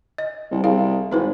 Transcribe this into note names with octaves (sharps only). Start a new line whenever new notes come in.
D#5
C2
C2 G#4 A#4 F5
G#1 E4 B4 C5